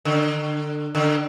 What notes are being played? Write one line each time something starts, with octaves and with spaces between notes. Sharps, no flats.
D3
D3